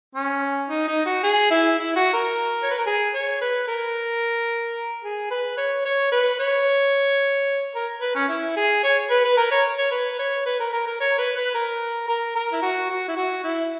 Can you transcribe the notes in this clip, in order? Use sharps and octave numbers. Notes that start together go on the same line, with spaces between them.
C#4
D#4
D#4
F#4
G#4
E4
E4
F#4
A#4
C#5
B4
A#4
G#4
C#5
B4
A#4
G#4
B4
C#5
C#5
B4
C#5
A#4
B4
C#4
E4
G#4
C#5
B4
B4
A#4
C#5
C#5
B4
C#5
B4
A#4
A#4
A#4
C#5
B4
B4
A#4
A#4
A#4
E4
F#4
F#4
E4
F#4
E4